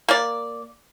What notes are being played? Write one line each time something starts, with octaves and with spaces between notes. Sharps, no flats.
A#3 D5